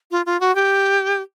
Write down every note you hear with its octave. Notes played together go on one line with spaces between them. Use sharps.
F4
F4
F#4
G4